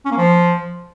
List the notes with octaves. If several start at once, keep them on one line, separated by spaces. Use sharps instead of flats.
C#4
A#3
F3